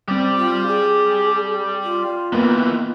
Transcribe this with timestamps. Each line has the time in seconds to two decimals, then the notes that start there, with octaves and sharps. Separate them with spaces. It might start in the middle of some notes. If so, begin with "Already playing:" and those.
0.08 G3 C4 G4 D5
0.36 F4
0.67 G#4
1.84 F4
2.32 D#3 E3 A#3 B3